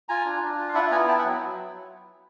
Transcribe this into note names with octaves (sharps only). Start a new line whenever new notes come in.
F4 G#5 A#5
D4
D4
F4
F5
E4 E5 F#5
B3 G#5 A#5
E4 G5 A5
E5 F#5
F#3